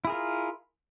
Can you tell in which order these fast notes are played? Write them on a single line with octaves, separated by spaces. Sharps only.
E4 G#4 A#4 F4